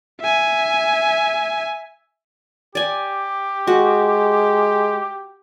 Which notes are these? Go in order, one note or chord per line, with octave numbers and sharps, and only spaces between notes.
E5 G#5
G4 D5 G#5
G#3 F#4